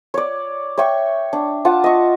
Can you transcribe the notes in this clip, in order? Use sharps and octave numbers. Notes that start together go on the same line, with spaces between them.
C#5 D5
C#5 E5 G5 C#6
D4
F4 F#5 A5
D#5 C#6